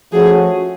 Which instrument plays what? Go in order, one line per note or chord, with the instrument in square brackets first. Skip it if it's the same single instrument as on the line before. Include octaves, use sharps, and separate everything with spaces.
[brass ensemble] F3 A3 C#4 F#4 [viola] G#4